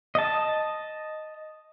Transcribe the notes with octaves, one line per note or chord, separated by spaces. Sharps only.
D#5 A5